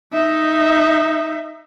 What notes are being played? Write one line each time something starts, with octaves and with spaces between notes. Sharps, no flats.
D#4 E5